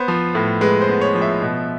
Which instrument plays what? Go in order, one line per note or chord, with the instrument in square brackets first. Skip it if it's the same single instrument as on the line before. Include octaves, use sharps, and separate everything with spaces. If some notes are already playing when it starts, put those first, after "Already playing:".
Already playing: [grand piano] B3 C5
F3
A2
G#3 B4
C5
B3
C#5
F3
E5
B2